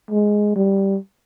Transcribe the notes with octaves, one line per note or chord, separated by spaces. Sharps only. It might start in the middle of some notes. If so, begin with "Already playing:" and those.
G#3
G3